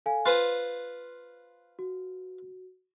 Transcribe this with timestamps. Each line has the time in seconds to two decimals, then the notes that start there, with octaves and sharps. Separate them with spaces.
0.06 A4 F5 G#5
0.26 F4 B4 C5 F#6 C7
1.79 F#4